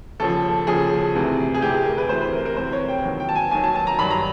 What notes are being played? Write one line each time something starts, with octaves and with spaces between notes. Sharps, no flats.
D#2 C#3 F3 A4
D#2 C#3 F3 G#4
D2 C3 E3
G#4
D2 C3 E3 G4
G#4
A#4
B4
D2 C3 E3 C5
B4
A#4
A#4
D2 C3 E3 C5
C#5
G5
D#2 D#3 F#3
G5
A5
G#5
D#2 D#3 F#3 G#5
A5
A5
A#5
G2 D#3 F#3 B5
A#5